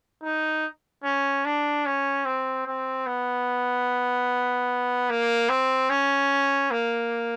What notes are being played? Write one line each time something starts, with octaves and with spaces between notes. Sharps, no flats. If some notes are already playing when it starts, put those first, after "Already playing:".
D#4
C#4
D4
C#4
C4
C4
B3
A#3
C4
C#4
A#3